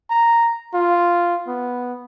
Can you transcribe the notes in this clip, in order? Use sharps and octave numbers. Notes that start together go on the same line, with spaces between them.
A#5
F4
B3